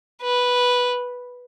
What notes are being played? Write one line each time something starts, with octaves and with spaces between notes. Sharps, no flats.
B4